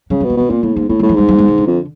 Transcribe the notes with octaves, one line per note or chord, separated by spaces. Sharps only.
C#3 F#3
F#3
B2
A#3
B2 C4
A#2 C4
A2 A#3
G#2 A#3
A2 C4
G3
A2
F3
G#2 G3
G3
G#3
D#3
D3
F2